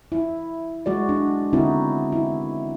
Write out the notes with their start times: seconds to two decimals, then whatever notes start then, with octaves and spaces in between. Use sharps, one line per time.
0.12 E4
0.86 G#3 F#4 D5
1.09 D4
1.53 D3 B3 C4 D#4 E4 F#4
2.12 E4